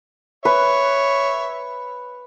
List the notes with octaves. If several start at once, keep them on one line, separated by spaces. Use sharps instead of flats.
B4 C#5 E5